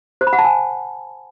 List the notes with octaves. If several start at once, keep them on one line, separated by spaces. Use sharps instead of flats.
C5
B5
F#5
A5
G#5